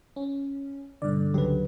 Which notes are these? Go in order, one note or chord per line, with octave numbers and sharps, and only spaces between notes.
C#4
G2 B2 D3 D5
C#2 C#3 F#3 G4 B4